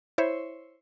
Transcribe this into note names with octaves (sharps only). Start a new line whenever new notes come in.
E4 C5 C#5 E5